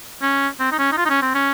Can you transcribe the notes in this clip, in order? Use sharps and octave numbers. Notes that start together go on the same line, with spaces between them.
C#4
C4
D#4
C#4
D#4
F4
D#4
C#4
C4
C#4